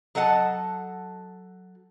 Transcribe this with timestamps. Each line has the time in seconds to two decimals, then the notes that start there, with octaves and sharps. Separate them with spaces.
0.15 F#3 A4 D#5 F#5 A5